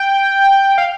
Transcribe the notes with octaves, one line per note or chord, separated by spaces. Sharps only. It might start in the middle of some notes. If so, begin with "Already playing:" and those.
Already playing: G5
F5